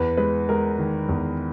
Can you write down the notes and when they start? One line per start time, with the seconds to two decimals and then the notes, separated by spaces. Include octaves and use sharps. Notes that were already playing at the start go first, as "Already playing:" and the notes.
Already playing: E2 B4
0.17 G#3 B4
0.49 G#3 A#4
0.79 D#3
1.09 E2